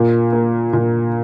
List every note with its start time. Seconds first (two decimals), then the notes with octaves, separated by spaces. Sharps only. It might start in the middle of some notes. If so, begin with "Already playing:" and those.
Already playing: A#2
0.33 A#3
0.73 A#2